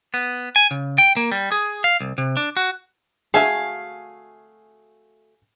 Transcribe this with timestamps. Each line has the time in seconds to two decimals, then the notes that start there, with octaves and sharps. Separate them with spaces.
0.14 B3
0.56 G#5
0.71 C#3
0.98 G5
1.17 A#3
1.32 G3
1.52 G#4
1.84 F5
2.01 C2
2.18 C3
2.37 D4
2.57 F#4
3.34 A3 F#4 G#4 E5 F5 G#5